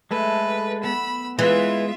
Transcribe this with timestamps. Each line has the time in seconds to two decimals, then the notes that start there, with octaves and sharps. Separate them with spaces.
0.11 G#3 A3 A4 B4
0.83 B3 B5 E6
1.39 E3 G#3 F4 E5